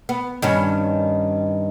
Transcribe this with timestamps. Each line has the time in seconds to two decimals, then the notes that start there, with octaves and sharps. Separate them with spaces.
0.09 B3
0.42 G2 D#3 C#4